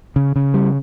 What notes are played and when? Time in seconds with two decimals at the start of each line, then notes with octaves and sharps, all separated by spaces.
0.16 C#3
0.36 C#3
0.54 G3